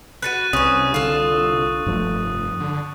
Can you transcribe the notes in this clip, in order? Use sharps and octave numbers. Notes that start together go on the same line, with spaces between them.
F#4 A4 B4 F#6 A6 D#7
C2 C3 C#4 B4 C#6 D#6
D3 F4 A4
F1 G2 F3 A3
D3